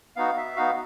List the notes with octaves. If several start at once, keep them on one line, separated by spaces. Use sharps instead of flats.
B3 D#4 F#4 F5
E5
B3 D#4 F#4 F5